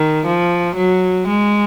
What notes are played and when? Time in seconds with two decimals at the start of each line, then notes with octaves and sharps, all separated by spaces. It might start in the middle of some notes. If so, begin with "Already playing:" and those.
Already playing: D#3
0.25 F3
0.76 F#3
1.27 G#3